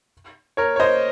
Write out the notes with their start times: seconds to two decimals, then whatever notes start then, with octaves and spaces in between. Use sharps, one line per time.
0.57 A#4 C#5
0.76 C#5
0.80 C5 D#5